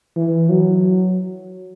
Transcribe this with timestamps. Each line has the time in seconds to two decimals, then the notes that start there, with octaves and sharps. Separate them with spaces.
0.16 E3
0.50 F#3